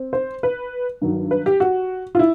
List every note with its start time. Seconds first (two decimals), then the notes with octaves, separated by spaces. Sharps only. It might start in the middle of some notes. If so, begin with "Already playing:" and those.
Already playing: C4
0.13 C5
0.43 B4
1.01 G2 D#3 F#3
1.31 B4
1.46 G4
1.60 F#4
2.15 F4
2.19 E4